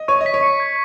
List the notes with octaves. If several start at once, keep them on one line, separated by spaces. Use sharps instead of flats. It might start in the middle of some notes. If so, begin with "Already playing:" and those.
Already playing: D#5
C#5 C#6
D#5
B6
C#5
C#7
G#6